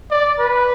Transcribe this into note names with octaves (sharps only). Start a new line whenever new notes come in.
D5
B4